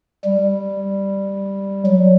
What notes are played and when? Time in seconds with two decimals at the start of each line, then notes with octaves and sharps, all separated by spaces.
0.24 G3
1.86 F#3